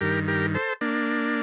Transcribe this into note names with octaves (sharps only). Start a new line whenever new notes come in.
G2 D#3 G4 A#4
G4 A#4
A4 C5
A#3 D4